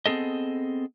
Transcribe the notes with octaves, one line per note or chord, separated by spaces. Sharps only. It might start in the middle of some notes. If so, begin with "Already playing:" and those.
B3 C4 G#4 A4 D#5